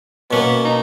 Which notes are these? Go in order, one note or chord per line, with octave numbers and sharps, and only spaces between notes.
B2 A#3 B3 C#4
D#4